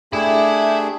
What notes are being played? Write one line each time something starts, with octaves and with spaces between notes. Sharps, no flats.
A3 D4 G4 G#4 E5 B5